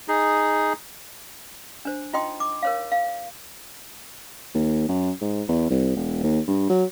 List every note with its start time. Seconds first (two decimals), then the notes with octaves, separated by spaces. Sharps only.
0.08 D#4 G#4
1.85 D4 C5
2.13 D#4 F4 D#5 G5 C6 D#6
2.40 D6
2.62 A#4 C#5 F5
2.92 F5
4.55 D#2
4.89 F#2
5.21 G#2
5.49 E2
5.70 C2
5.96 E1
6.23 D#2
6.48 G2
6.70 F#3